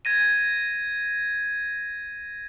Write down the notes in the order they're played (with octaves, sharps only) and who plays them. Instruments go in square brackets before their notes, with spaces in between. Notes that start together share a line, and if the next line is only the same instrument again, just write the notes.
[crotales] G#6 A#6 D#7